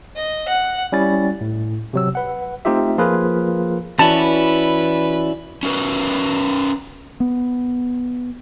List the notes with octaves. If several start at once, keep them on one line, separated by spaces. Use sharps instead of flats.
D#5
F#5
G3 C#4 E4 A6
A2
C3 F#3 E6
B4 F#5
A3 C4 D#4 F4 G4 E5
F3 A#3 F4 G#4 A#4 B4
E3 C#4 E4 F#4 B4 D5 A5
C#4 F#4 A#4 B4
B3